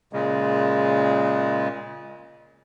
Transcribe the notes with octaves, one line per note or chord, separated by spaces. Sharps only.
A#2 C#3 G#3